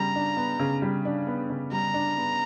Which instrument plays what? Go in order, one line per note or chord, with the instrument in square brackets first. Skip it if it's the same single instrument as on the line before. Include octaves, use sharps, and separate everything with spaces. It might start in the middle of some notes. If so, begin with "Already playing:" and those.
Already playing: [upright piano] C#3 G3 B3 [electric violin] A#5
[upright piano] D4
B3
C#3
G3
D4
B3
C#3
[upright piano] G3 [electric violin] A#5
[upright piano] D4
B3